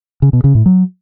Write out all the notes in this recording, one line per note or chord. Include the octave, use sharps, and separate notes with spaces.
C#3
B2
C#3
A2
F#3